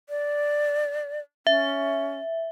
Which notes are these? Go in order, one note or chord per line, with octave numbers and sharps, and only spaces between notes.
D5
C#4 E5